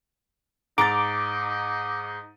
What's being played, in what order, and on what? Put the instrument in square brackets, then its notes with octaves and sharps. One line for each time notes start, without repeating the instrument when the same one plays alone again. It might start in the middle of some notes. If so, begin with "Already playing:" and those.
[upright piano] G#2 A6 [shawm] D#4 [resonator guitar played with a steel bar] A#5 [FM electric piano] D6